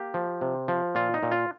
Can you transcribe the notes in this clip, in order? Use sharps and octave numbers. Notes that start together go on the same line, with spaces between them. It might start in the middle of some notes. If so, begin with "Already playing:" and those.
Already playing: A#3 G4
F3
C3
F3
A#2 F4
D#4
A#2
F4